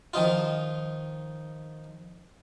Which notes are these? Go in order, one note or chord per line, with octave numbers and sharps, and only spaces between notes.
D#3 F3 D#4 F4